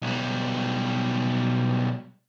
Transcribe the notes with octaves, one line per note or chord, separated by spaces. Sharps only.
B1 G3